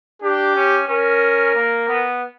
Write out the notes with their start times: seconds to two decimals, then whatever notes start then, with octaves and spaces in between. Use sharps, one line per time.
0.22 D4 G4
0.55 C#4
0.88 C#4 A#4
1.55 A#3
1.88 B3